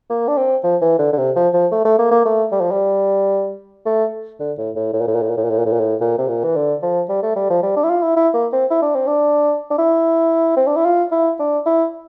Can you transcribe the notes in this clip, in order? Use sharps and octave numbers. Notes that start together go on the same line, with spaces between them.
A#3
D4
C4
F3
E3
D3
D3
C3
F3
F3
A3
A3
A#3
A#3
A3
G3
F3
G3
A3
D3
A2
A2
A2
A#2
A2
A#2
A2
A#2
A2
A#2
A2
A#2
A2
A#2
A2
A#2
C3
A#2
E3
D3
F3
G3
A3
G3
F3
G3
D4
E4
F4
E4
E4
A#3
C4
E4
D4
C4
D4
D4
E4
C4
D4
E4
F4
E4
D4
E4